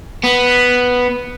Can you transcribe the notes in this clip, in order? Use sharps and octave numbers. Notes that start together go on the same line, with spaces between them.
B3